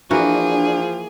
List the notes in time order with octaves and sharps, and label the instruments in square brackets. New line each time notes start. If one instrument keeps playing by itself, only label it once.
[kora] E3 A#3 F#4 [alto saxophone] F3 [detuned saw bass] D4 [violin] G#4